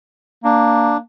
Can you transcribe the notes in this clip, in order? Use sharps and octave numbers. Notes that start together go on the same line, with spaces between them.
A#3 D4